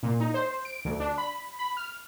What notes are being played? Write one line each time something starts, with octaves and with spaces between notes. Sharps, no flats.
A#2
D#4
C5
D7
D2
D4
B5
B5
F6